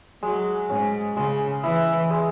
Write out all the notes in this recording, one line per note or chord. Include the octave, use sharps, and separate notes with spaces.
F#3 G#3
G#2 C#4
C#3 G#3
E3 E4
G#3